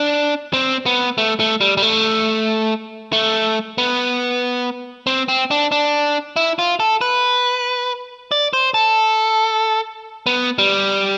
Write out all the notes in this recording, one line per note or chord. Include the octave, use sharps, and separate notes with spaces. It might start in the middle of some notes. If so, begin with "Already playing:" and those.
Already playing: D4
C4
B3
A3
A3
G3
G3
A3
A3
B3
C4
C4
D4
D4
E4
F4
A4
B4
D5
C5
A4
B3
G3